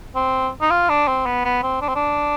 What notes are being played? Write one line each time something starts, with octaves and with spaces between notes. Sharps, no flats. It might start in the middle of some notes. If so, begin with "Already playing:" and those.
C4
D#4
F4
D4
C4
B3
B3
C4
D4
C4
D4